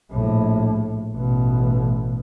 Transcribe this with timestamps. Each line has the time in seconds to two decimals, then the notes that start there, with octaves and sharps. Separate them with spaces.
0.11 A#1 A2
1.14 A1 B2